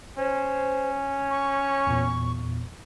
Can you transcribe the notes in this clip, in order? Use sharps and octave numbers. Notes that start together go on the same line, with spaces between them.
C#4 C5
C#6
E2 A#2